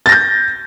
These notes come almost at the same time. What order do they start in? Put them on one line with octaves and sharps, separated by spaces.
A6 A#6 G6